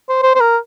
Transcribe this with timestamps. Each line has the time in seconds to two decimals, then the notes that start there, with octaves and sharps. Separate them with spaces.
0.09 C5
0.23 C5
0.35 C5
0.40 A#4